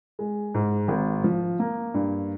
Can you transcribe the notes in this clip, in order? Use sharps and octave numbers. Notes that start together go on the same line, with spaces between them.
G#3
G#2
G#1
F3
A#3
G2